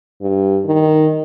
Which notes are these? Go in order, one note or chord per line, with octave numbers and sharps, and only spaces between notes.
G2
D#3